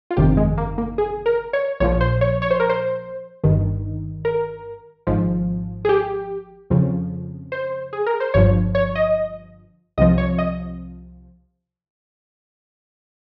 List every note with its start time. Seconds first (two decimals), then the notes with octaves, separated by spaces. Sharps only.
0.11 F4
0.17 G1 F2 C3 D#3 G4
0.37 G#3
0.58 A#3
0.78 A#3
0.98 G#4
1.26 A#4
1.53 C#5
1.80 A#1 A#2 F3 C#5
2.01 C5
2.21 C#5
2.42 C#5
2.51 C5
2.60 A#4
2.69 C5
3.44 G1 G2 D#3
4.25 A#4
5.07 G#1 G#2 F3
5.85 G#4
5.89 G4
6.70 F2 C#3 F3
7.52 C5
7.93 G#4
8.06 A#4
8.20 C5
8.34 G1 G2 F3 C#5
8.75 C#5
8.95 D#5
9.98 C2 C3 F3 D#5
10.18 C#5
10.38 D#5